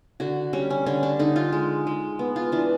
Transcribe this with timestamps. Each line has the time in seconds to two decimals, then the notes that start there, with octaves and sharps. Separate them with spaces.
0.20 D3 F#4
0.53 G3 C#4
0.70 C#4
0.86 D3 C#4
1.03 D4
1.19 D3 D#4
1.36 F4
1.53 G#3
1.87 G#3
2.19 B3
2.36 F4
2.52 E3 D4